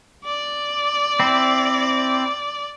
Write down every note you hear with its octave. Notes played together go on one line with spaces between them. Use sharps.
D5
C4 E4